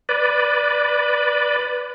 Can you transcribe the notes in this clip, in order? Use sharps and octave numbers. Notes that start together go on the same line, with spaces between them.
B4 D5